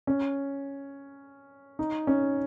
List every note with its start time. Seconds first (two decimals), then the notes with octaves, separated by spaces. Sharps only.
0.07 C#4
1.79 D#4
2.07 C#4